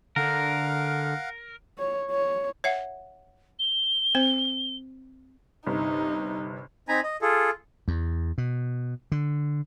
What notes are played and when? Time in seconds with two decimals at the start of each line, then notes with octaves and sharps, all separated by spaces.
0.16 D3 A#4 F5 F#5
1.78 C#5
2.10 C#5
2.64 C#5 E5 F#5
3.59 G7
4.15 C4 C5
5.66 G1 C3 D#4
6.88 C4 D#4 G#5 A#5 B5
7.04 D#5
7.22 F4 G#4 A4
7.88 E2
8.38 B2
9.12 D3